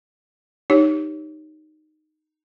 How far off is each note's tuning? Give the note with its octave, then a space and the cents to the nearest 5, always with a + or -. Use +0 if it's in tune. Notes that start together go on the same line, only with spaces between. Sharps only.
D#4 -10 G4 -5 C#5 +0